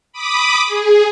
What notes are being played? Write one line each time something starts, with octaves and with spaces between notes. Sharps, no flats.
B5 D6 D#6
G#4